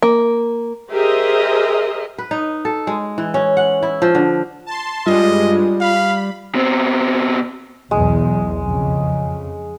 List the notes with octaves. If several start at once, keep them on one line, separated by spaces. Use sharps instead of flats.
A#3
G4 G#4 A#4 C5 D#5 E5
B4
D#4
A4
G#3
E3
C#4
F#5
E4
F3
D3
A5 C6
G2 G3 G#3 F4 D#5
F5 B5
B2 C4
B1 E2 G#3
F2 C#3